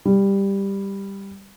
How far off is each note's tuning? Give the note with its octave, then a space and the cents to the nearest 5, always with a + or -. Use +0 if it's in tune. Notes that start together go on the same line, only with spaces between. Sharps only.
G3 +10